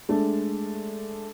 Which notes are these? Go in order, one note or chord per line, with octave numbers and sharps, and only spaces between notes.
G#3 A3 D4